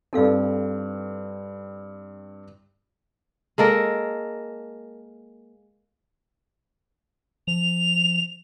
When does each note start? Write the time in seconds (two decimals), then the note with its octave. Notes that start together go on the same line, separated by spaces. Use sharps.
0.13 G2 C4 D#4 A4 F5
3.58 G#3 A#3 A4 A#4
7.47 F3 F7